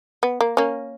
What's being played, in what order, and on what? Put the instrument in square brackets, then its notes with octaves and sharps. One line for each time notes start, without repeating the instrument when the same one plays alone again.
[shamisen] B3
A#3
A#3 C#4